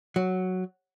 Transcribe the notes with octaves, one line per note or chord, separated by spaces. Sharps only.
F#3